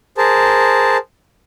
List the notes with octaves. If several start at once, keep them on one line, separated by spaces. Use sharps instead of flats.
G#4 A#4 C5 A5